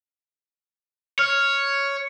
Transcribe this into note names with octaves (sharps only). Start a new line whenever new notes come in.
C#5 F6